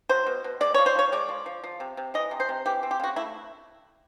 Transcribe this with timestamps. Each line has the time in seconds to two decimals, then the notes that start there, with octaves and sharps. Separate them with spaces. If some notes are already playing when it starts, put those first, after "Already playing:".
0.09 F#3 C5
0.26 B2
0.44 B2
0.61 G#3 D5
0.74 F3 C#5
0.86 C5
0.95 F3 C#5
1.12 G#3 D5
1.29 F3
1.46 F3
1.64 F3
1.80 C3
1.97 C3
2.14 E3 D#5
2.31 C3
2.40 C5
2.49 C3
2.66 E3 G4
2.83 C4
2.91 G4
3.00 C#3 F#4
3.16 A3 E4